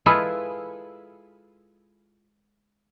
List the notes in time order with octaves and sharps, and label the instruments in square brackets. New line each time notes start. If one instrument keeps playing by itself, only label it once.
[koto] G#3 E4 F4 G#4 A4 B4